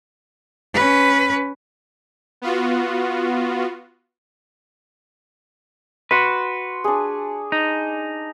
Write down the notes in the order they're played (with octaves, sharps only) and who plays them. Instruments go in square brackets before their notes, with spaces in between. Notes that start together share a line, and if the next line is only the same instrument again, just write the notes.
[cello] C#4 B4
[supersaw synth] B3 F4 F#4
[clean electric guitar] F#4 B4 [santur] C6
[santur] D4 G#4
[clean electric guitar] D#4